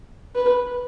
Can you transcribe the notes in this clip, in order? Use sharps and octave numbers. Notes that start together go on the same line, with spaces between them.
B4